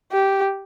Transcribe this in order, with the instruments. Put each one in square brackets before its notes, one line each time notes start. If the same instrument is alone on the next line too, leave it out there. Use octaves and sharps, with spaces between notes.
[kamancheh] G4